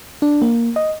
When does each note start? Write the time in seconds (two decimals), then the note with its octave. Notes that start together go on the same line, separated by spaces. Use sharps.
0.22 D4
0.42 A#3
0.76 D#5